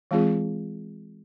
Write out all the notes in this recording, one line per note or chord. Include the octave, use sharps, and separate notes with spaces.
E3 G#3 C4 F4 G#4